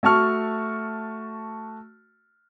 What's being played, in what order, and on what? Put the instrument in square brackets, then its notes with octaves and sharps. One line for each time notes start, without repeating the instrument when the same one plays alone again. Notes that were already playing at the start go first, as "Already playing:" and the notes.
[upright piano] A3 F#4 A5 C#6 F6